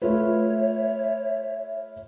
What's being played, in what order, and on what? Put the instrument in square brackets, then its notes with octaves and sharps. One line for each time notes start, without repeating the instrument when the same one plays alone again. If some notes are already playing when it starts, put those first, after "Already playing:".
[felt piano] A3 F4 B4 [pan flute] C#5 [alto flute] E5